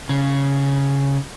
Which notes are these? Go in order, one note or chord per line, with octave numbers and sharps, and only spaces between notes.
C#3